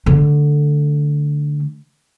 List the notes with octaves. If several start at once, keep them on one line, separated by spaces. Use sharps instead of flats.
D3 A3